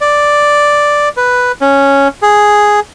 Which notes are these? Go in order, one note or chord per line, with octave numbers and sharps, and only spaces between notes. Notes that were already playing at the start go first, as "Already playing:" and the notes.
D5
B4
C#4
G#4